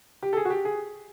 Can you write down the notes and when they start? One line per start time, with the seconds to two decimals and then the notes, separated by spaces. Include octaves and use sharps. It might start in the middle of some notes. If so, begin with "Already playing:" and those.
0.23 G4
0.33 A4
0.37 G#4
0.45 F#4
0.50 G4
0.65 G#4